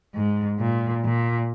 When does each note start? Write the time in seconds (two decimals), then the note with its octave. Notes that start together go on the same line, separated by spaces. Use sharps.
0.15 G#2
0.60 A#2
1.04 A#2